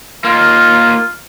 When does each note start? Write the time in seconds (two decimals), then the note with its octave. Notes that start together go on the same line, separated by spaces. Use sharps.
0.24 A#3 D#4 F4